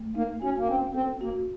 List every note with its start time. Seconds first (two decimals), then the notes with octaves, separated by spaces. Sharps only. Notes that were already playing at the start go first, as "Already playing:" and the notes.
Already playing: A3
0.15 A#3 D#4
0.42 C#4 F#4
0.58 A#3
0.67 C4 C#4
0.94 C4 A4
1.21 A#3 F#4